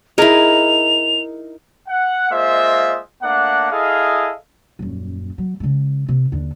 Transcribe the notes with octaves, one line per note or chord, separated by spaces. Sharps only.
D#4 E4 G#4 A#4 F7
F#5
G#3 A#3 F4 C5 D#5 E5
A3 A#3 D4 F#5
E4 G#4 A4 D#5 F5
D#1 F#2
F#3
C#3 G#3
C3
D#2 D3